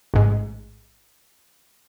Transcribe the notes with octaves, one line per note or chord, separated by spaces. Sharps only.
A1 G#2